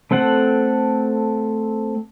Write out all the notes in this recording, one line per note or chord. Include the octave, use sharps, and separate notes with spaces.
A3 C4 A4 F#5